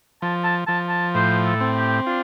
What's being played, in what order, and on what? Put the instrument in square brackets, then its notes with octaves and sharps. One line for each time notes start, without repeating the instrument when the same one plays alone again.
[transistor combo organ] F3 [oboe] A5
[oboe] A5
[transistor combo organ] F3 [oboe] A5
[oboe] A5
[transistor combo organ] A2 [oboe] C5
[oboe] A4
[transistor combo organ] C4
[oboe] G4
[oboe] D4 [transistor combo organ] F4